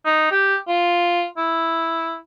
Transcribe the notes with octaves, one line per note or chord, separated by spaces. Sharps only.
D#4
G4
F4
E4